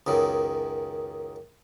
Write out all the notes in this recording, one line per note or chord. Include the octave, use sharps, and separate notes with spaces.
C#2 F#2 D#3